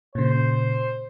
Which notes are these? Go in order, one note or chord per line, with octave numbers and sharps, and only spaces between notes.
A#2 C#3 C5